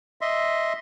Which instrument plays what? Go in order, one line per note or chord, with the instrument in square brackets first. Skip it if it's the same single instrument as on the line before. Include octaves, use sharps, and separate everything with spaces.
[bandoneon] D#5 E5 C6